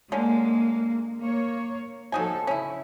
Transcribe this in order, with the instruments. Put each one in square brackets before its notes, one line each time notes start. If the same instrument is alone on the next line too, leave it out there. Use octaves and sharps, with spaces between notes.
[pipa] D3 C#4 [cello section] G#3 A#3
[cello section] A#3 C#5
[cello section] F3 A4 [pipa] F#3 D#4 G#5
[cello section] C#3 [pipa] C#4 E4